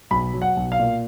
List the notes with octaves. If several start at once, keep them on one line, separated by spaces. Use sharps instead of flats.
B1 B5
F#3
F#5
B1
F5
A#2